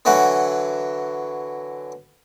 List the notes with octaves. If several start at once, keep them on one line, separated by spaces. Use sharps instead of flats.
D3 E3 F#3 F#5